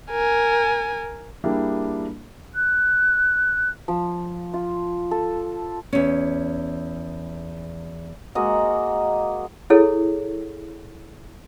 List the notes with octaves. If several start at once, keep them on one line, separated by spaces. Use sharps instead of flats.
A#4 G#5
G3 A#3 D4 E4 G4 G#4
F#6
F3
F4
A4
E2 C#4
G#3 A#3 F#4 D#5
E4 G#4 A4 C#5